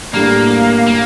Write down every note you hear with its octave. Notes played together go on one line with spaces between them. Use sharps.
A2 G3 A#3 D4
A#3